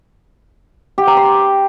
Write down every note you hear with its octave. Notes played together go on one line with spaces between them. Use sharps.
G4
A#5
C6